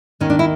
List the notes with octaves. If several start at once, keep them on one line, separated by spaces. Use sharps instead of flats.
D#2 D#3 C#4
D4
E4